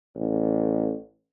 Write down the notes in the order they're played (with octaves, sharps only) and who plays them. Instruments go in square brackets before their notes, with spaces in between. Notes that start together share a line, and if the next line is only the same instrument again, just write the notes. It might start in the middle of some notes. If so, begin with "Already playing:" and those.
[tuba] A1